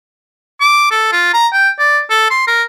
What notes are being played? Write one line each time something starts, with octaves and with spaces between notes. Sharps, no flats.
D6
A4
F4
A#5
G5
D5
A4
C6
A#4